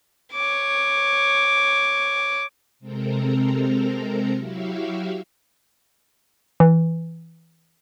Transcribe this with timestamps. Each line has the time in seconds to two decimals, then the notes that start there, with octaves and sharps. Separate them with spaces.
0.33 C#5 D6
2.80 C3 G#3 C4 A4 A#4 A#5
4.36 F#3 E4 F#4 G4 E5 F5
6.60 E3